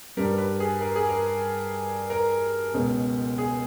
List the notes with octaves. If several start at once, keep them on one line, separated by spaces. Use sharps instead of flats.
G2 G3 A#4
B4
G#4
A#4
G#4
A#4
A#4
C#2 B2 G#3
G#4